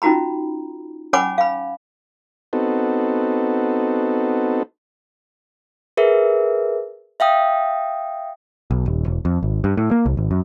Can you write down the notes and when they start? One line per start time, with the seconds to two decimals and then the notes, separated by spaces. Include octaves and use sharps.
0.02 C#4 D#4 F4 F#4 A#5 B5
1.13 C#4 C#5 F#5 G#5 B5 D6
1.38 F5 B5
2.53 B3 C4 D#4 F#4 A4
5.97 G#4 A#4 B4 E5
7.20 E5 F5 G5 D#6
8.71 B1
8.86 D#1
9.06 E1
9.25 F2
9.43 G#1
9.64 G2
9.77 A2
9.91 A#3
10.06 C2
10.17 G#1
10.31 F#2